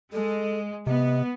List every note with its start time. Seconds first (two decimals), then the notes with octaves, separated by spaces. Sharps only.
0.13 G#3 A4
0.87 C3 B3 D#5